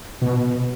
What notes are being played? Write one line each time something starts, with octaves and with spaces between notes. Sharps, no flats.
B2